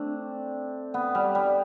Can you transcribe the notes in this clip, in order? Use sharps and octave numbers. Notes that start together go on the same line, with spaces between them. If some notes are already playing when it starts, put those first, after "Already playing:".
Already playing: A3 C4 D4
B3
G3
G3